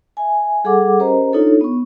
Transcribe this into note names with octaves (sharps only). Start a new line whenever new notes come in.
E5 G#5
G3 G#4 A4 F#5 D6
C#4 G4 A#4 C5 D#5 A#5
D4 D#4 F4 A4 C#5
B3 C#6